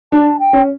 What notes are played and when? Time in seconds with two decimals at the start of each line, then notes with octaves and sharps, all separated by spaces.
0.12 D4 A5
0.39 G5
0.53 C#4